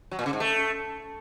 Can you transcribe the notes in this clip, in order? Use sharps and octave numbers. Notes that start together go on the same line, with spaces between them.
F#3
A#2
C#3
G#2
A3